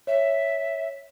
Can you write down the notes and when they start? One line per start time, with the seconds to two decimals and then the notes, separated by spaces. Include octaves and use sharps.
0.07 C#5 E5